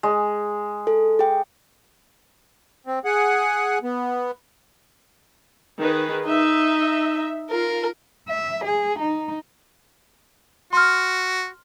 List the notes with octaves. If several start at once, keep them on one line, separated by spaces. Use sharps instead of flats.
G#3
A4
G#4 G5
C4
G#4 F#5
B3
D#3 G#4 B4
D#4 E5
F4 A#4
E5
G#4
D#4
F#4 C6 F6